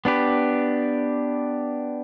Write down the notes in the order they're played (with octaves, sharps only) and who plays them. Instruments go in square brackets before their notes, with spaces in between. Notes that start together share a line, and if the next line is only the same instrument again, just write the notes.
[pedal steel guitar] B3 D4 G4 B4